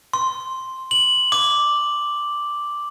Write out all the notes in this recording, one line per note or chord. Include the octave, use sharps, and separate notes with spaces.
C6
F#7
D6